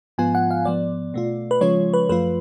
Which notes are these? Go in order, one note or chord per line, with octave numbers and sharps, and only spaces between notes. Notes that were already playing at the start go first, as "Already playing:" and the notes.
G#2 F3 B3 F4 G#5
F#5
F5
G#2 F3 B3 D5
B2 A3 F4
B4
C#3 F3 G#3 C#4 F4 C#5
B4
F#2 F3 A3 F4 B4